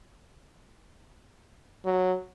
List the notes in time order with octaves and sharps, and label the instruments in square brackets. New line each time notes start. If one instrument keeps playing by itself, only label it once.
[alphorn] F#3